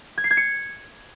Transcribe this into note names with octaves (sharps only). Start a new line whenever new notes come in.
G#6
C7
G#6
C#7